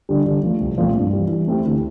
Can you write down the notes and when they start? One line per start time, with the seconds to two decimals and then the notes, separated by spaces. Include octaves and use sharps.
0.09 D3 G3
0.26 D3
0.43 F3 A3
0.60 C2
0.78 A#2 F3 A3 C4
0.95 G2
1.13 E3 G3
1.30 E3
1.47 A3 C4 E4 G4
1.65 D2